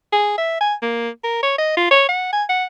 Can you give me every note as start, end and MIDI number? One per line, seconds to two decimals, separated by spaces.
0.12 0.34 68
0.38 0.59 76
0.61 0.74 80
0.82 1.09 58
1.24 1.42 70
1.43 1.55 73
1.58 1.76 75
1.77 1.87 65
1.91 2.04 73
2.09 2.31 78
2.33 2.44 80
2.49 2.64 78